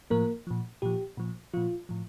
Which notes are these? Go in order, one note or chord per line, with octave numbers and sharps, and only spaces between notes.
A2 F3 A#3 A#4
A#2 F3
A#2 F3 G4
A#2 F3
A#2 F3 F4
A2 F3